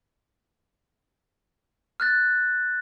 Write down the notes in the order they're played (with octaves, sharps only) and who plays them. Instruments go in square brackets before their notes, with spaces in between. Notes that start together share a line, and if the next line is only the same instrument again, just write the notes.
[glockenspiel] F6 F#6 A6